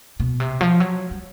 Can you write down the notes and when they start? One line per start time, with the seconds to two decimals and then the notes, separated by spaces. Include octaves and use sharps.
0.20 B2
0.40 C3
0.61 F3
0.80 F#3
1.11 G3